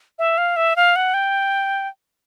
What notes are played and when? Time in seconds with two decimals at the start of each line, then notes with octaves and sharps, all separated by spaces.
0.19 E5
0.38 F5
0.56 E5
0.76 F5
0.96 F#5
1.14 G5